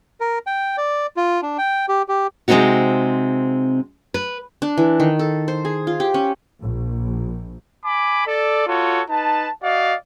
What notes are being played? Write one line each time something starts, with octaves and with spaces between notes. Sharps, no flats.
A#4
G5
D5
F4
D4
G5
G4
G4
C3 G#3 A3 C4 D#4 F#4
B4
D4
E3
D#3
A4
C5
G#4
F4
G4
C#4
A#1
G#5 B5 D6
A4 D5
F4 F#4 A4 C#5
D#4 B4 A5
F#4 D5 D#5 F5